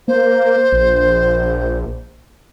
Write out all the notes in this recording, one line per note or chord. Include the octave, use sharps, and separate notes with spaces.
A#3 C5
A#1